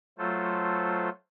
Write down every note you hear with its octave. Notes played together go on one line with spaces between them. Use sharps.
F#3 A3 F4 A4 C5